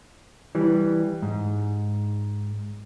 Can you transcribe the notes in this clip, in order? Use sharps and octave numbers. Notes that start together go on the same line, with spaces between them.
E3 G3
G#2